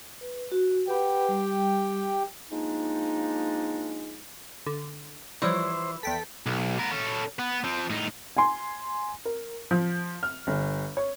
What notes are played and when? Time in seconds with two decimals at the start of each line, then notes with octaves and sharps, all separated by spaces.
0.21 B4
0.52 F#4
0.88 G4 B4 F#5 G5 B5
1.29 G3
2.51 F3 G#3 A#3 D4 D#4
4.66 D3
5.42 E3 F3 G3 C5 C#5
6.03 E2 A4 G5 B6
6.46 B1
6.78 B3 A#4
6.91 C#4 A4
7.39 B3
7.64 F3 C4
7.90 A2 D#4
8.37 G#5 C6
9.25 A#4
9.71 F3
10.23 F6
10.47 G1
10.97 C#5